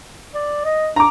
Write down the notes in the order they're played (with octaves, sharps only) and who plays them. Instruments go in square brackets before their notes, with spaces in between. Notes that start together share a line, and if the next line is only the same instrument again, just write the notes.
[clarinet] D5
D#5
[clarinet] D4 [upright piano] A#5 D6